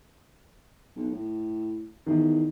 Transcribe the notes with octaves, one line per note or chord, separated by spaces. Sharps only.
B1
A2
E2 D#3